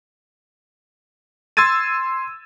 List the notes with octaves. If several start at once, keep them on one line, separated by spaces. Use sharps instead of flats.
C6 E6 G#6 A6 D#7